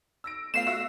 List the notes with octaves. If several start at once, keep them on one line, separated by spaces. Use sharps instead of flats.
E6 A#6 D7
A3 B3 F4 F5 C7 E7
F#4 E5 E6